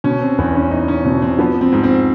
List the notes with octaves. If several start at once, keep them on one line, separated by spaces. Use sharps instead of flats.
B2 C#4
C4
E2 B3
C#4
E2 D#4
C#4
B2 C4
C4
F3 B3
C4
G#2
C4